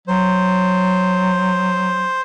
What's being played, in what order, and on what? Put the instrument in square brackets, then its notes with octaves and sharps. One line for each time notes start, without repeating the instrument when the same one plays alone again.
[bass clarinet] F#3 [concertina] C5